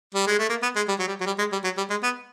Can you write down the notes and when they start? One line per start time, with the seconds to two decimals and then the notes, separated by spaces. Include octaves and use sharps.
0.15 G3
0.27 G#3
0.39 A3
0.49 A#3
0.63 B3
0.76 G#3
0.88 G3
0.99 F#3
1.07 G3
1.21 F#3
1.26 G3
1.39 G#3
1.52 G3
1.64 F#3
1.77 G3
1.90 G#3
2.03 B3